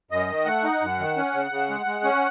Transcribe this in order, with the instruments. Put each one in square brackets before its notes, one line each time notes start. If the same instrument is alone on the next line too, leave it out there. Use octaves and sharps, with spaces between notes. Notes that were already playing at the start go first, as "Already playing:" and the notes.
[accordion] F#2 D#5
D#3
A3 F#5
D#4
F#2
D#3
C#4
C#3
C#3
G#3
G#3
C#4